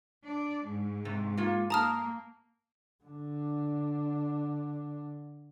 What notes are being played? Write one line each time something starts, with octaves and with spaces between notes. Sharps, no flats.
D4 D5
G#2 G#3
C3
A#3 F4
A#3 A5 A#5 D#6 F6
D3 D4